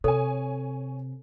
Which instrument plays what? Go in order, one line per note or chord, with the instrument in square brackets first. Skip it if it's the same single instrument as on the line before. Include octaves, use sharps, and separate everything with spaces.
[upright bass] C3 [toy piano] A4 [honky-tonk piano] C#5 G#5